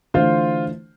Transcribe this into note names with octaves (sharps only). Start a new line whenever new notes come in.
D3 E3 A3 F4 C5